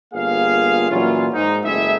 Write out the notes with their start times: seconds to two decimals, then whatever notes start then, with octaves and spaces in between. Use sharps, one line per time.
0.14 G1 A#3 F4 G#4 F5
0.91 A#2 E3 F#3 C#4 F4
1.34 G#2 D#4
1.65 F#1 G#3 A3 E4 G#4 E5